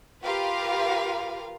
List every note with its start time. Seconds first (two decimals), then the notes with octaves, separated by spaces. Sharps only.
0.24 F4 G4 A#4 B4 F5